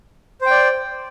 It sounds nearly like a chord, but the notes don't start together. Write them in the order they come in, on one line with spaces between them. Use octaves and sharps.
C5 G5 D5